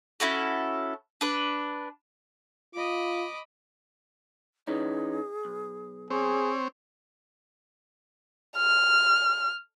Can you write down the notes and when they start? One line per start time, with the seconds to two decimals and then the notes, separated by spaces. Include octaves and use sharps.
0.20 C#4 E4 F#4 A4
1.21 D4 B4
2.75 F4 D#5 B5 D6
4.67 E3 C#4 D#4 G#4
5.45 B1
6.10 C4 G#4 C#5
8.58 F6